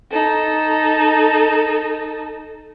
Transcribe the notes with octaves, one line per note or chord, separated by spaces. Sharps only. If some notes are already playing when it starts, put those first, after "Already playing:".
D#4 A4